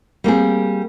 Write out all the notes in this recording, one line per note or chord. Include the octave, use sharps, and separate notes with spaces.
G3 A#3 C4 G#4